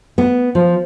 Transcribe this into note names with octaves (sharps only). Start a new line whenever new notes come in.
B3
F3